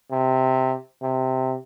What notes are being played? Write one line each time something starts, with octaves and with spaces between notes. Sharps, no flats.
C3
C3